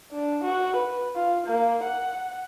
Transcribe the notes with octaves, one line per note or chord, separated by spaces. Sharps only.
D4
F#4
B4
F4
A#3
F#5